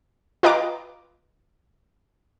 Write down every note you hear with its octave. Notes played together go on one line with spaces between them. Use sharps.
F4 B4 D#5 G5 A#5 D6